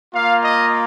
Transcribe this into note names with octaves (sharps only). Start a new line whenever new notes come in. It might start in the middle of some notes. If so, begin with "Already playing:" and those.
A#3 F4 F5
D#5